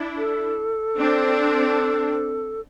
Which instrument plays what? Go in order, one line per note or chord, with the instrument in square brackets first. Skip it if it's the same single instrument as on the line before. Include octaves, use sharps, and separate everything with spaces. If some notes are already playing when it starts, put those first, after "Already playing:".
Already playing: [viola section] D4 E4
[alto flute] A4
[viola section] C4 D4